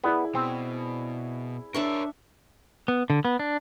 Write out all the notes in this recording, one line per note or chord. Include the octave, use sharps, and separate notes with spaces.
B3 E4 G#4 D5
B2 C4
D4 A#4 C#5 E5 C#6
B3
D3
B3
D4